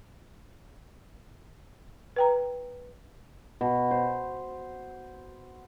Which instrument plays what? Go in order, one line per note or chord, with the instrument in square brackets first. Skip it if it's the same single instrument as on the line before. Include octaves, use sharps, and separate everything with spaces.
[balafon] B4 G5 A#5
[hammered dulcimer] B2
C5